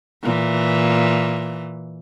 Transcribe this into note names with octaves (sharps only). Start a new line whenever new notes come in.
A#2 E3